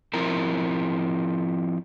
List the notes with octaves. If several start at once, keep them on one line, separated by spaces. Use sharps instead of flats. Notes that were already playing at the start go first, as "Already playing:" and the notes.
F3 C4 E4 A#4